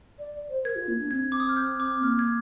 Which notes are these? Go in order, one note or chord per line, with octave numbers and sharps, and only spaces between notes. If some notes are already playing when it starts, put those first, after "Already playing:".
D5
C5
A#4 G#6
F4
A#3
D4
C4 G#6
D6
D#6
F6
G6
D6
A#3 F6
G#6